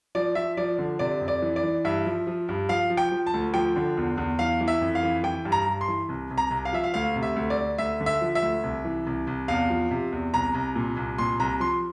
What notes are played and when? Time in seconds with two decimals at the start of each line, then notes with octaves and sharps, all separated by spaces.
0.15 F3 D5
0.35 F3 E5
0.57 F3 D5
0.78 D3
0.99 C3 D5
1.21 F2
1.28 D5
1.42 E3
1.56 D5
1.63 E3
1.84 G2 E5
2.06 F3
2.27 F3
2.49 G2
2.69 F3 F5
2.90 F3
2.97 G5
3.11 F3
3.26 A5
3.34 D2
3.54 F3 G5
3.76 D3
3.97 E2
4.18 E2
4.39 E3 F5
4.61 E3
4.68 E5
4.81 F2
4.95 F5
5.03 E3
5.23 E3 G5
5.45 G2
5.52 A#5
5.67 G2
5.81 C6
5.88 E3
6.09 C2
6.31 C2
6.38 A#5
6.51 C2
6.65 F5
6.73 F3 E5
6.84 F5
6.94 D2 F5
7.16 C3
7.23 E5
7.36 D2
7.50 D5
7.58 D2
7.78 D2 E5
8.00 D3
8.06 E5
8.21 F3
8.35 E5
8.42 D2
8.63 C2
8.85 E3
9.07 C2
9.27 C2
9.48 E2 F5
9.70 F3
9.91 C3
10.12 E2
10.34 C2 A#5
10.55 C2
10.75 A#2
10.97 C2
11.18 A#2 C6
11.40 C2 A#5
11.60 F3 C6